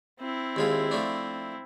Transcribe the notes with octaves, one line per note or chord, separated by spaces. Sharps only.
C4 E4
D#2 G#3 F4
F3 A3 D4